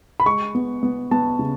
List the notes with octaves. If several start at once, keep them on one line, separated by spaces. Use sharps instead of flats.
B5
G#3 C#6
B3
B3
B3 A5
C#3